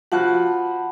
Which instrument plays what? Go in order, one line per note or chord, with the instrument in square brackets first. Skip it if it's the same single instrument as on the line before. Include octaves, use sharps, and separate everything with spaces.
[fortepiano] F3 F#4 F#6 [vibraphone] F#5 A5 B5